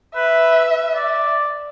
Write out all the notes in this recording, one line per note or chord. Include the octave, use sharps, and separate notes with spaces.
B4 E5
D5